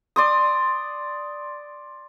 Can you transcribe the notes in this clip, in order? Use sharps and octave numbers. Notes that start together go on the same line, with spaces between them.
D5 C6 D#6